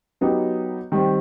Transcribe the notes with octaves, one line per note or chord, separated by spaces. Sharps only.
F#3 B3 D#4 G4
D#3 G3 C4